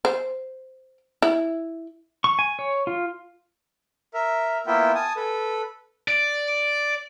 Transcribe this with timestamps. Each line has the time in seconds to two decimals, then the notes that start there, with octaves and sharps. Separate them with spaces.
0.05 C5
1.22 E4
2.24 C#6
2.39 G#5
2.59 C#5
2.87 F4
4.14 A#4 E5
4.67 A#3 B3 E4 F4 E5 G5
4.95 G#5 A5 D#6
5.16 A4 B4
6.08 D5